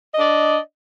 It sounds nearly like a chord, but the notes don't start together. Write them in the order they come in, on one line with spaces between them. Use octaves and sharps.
D#5 D4 D5